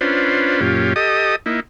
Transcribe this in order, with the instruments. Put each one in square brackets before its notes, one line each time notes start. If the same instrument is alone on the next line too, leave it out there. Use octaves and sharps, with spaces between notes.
[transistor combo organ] C#4 D4 F4 B4 C5
F#2 A#2 C#4 F4 G4
G4 A4 D#5 D#6
A#3 D#4 E4